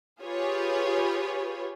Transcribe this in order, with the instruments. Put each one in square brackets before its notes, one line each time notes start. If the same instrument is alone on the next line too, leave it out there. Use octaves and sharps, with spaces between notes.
[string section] F4 G4 G#4 B4 C#5